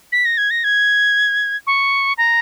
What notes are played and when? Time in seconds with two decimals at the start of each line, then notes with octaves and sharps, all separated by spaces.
0.12 B6
0.25 A#6
0.38 G#6
0.51 A#6
0.64 G#6
1.67 C#6
2.18 A#5